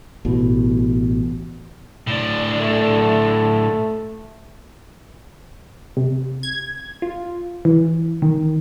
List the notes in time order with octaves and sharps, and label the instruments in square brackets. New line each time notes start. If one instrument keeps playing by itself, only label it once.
[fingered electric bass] A1 B2
[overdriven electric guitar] A2 D4
[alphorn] A3
[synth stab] C3
G#6
F4
E3
D#3